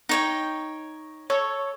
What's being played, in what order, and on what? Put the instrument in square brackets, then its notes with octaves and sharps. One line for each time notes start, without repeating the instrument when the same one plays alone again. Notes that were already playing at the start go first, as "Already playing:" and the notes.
[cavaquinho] D#4 C#5 G5
[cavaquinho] A4 [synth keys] C#5